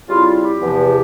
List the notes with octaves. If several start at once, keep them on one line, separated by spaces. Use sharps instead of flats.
C#3 G3 C4 E4 F4
F4
G4
E2 C3 F3